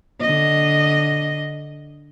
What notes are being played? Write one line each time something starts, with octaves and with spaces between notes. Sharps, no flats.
D3 D#5